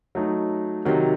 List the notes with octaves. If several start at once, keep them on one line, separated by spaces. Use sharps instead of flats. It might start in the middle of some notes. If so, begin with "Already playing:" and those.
F#3 A3 D#4
C3 D#3 F#3